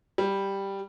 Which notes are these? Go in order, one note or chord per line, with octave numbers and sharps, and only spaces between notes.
G3